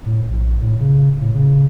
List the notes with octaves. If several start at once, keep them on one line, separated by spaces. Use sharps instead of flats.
A2
A#1
A2
C#3
A2
C#3